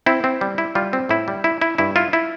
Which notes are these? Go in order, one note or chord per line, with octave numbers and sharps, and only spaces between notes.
C4 E4
C4
G3
E4
G3 F4
C4
A2 E4
G3
E4
E4
G2 E4
E4 F4
E4